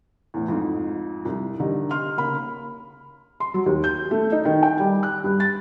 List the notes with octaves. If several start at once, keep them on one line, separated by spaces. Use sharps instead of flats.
E2 A2
F2 G#2
C2
D3 D#3 G3 D#4
C6 F6
C#3 A#3 B5
C6
F#3
D#2
G6
A3
D#4
D#3
G5
G3
F#6
G2
A6